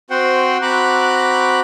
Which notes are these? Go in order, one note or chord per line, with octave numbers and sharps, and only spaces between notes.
C4 F#4 C5 F#5 G5 C6
C4 F#4 A#5 B5 D6 F#6